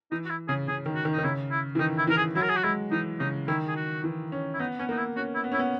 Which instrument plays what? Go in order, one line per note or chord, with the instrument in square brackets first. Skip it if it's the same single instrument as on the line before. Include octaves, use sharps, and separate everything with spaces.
[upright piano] E3 [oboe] D#4
[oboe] F#4
E4
[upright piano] C#3 [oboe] G#4
[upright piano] C#3 [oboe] G#4
[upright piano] D#3
[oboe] F#4
[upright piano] D#3
[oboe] D#4
[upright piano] D#3
[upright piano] C#3 [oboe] E4
[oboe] E4
[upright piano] E3
[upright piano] D#3 [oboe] D#4
[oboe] E4
[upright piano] E3 [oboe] A#4
[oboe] G#4
[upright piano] F#3 [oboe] E4
[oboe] A#4
G#4
F#4
[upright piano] G#3 [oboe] E4
[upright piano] E3 [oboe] D#4
[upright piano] C#3 [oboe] D#4
[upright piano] D#3 [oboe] E4
[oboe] G#4
F#4
[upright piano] E3
C#4
[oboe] E4
[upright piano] B3 [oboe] D#4
[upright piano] B3 [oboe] C#4
[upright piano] A#3 [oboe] D#4
[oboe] E4
[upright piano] C#4 [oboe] F#4
[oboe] E4
[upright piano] B3
[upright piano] C#4 [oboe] E4
[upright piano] B3